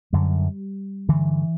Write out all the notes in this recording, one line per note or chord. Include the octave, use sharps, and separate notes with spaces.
F#2 D3 G3
G2 D3 E3